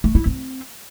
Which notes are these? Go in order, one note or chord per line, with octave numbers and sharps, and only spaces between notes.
A3
E4
C4